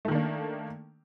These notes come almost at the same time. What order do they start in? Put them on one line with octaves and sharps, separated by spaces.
A3 D#3 A#3 D4